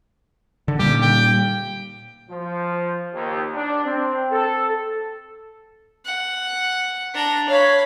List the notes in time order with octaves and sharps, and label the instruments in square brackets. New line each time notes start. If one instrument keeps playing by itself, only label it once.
[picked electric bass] D3
[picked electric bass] A#2 G3 [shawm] G4
[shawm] G5
[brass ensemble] F3
D#2
D4
C4
A4
[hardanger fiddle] F#5
D4 A#5
[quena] C#5 [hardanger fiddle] F5 B5